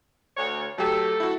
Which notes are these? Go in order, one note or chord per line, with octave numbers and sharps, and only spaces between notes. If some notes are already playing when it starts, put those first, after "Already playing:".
D2 C#5
F#3 A3 G4 A4
E4 F#4